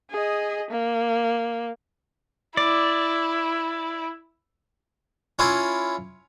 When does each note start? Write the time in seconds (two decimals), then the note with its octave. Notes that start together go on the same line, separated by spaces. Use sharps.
0.10 G#4 D#5
0.70 A#3
2.57 E4 D5
5.39 C#4 E4 F4